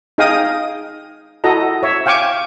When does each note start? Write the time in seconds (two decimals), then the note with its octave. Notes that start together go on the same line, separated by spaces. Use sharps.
0.18 D#4 G#4 D#5 F5 G5 D#6
1.44 E4 F#4 A4 D#5 A#5
1.83 C#5 E5
2.06 F5 G5 G#5 C#6 D6